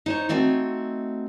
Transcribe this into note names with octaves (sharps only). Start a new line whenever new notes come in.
D#4 C5 C#5
A3 C4 D#4 F#4 C#5